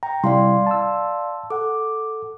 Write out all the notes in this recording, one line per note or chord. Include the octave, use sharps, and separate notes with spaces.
G5 A#5
C3 G3 E4 D5 F5 C6
A5 E6
A4 F#5 D6